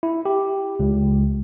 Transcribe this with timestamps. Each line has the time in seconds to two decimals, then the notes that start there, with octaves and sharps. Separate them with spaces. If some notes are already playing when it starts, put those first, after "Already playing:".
0.03 E4
0.26 G4
0.80 C#2